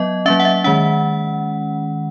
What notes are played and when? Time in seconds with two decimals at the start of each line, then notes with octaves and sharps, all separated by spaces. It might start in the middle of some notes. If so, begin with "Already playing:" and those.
Already playing: F#3 B3 D#5
0.26 F#3 A#3 C#4 E5
0.40 F#5
0.45 E5
0.64 D#3 G#3 C#4 F#5